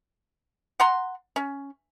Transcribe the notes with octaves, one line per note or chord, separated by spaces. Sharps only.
F#5 A#5 C6
C#4